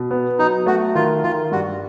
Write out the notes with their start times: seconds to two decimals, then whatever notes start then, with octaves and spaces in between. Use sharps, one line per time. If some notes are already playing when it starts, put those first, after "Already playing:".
Already playing: B2
0.11 B3
0.39 F#3 D#4
0.66 A3 F#4
0.95 D#3 F4
1.23 D#3 F4
1.52 G2 F#4